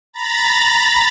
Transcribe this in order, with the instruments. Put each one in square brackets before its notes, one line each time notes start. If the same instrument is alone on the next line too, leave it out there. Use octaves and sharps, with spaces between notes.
[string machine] A#5 B5 A6 A#6